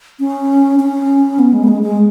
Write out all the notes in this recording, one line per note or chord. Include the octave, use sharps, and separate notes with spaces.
C#4
C#4
B3
G#3
B3
G#3
G#3